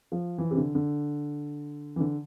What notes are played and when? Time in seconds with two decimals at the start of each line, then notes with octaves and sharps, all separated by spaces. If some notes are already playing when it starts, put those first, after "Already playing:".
0.12 F3
0.38 E3
0.51 C3
0.57 D3
0.75 D3
1.96 E3
2.00 D3